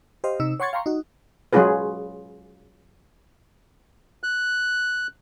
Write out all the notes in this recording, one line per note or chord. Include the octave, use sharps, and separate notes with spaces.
G4 C5 D#5 F5
C3 D#4 E6
C#5 F#5 C6 C#6 G#6 A6
F5 G5 A#5 C6 C#6
D#4 F#4
F#3 G#3 C#4 F4 G#4 B4
F#6